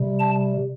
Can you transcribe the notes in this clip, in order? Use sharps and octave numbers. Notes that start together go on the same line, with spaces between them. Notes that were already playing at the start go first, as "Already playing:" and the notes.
Already playing: C3 G3
A5